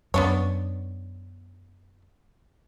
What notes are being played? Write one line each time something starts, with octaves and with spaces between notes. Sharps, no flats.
F#2 B3 D4 C#5